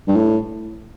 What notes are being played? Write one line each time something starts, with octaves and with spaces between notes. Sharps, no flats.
G2
A2